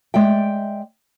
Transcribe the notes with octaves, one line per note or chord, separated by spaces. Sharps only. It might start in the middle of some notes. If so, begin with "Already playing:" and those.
G#3 D5 E5 G5